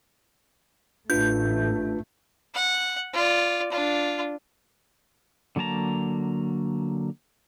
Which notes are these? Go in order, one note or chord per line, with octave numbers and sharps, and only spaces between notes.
A1 A3 D4 F4 B4 G6
F#5
F4 D5
D4 F4
D3 F#3 A#3 A5 A#5